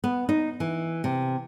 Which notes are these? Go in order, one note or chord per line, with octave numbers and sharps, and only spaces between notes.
B3
D#4
E3
C3